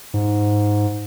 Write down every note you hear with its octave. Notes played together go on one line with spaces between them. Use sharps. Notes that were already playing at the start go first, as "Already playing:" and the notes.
G#2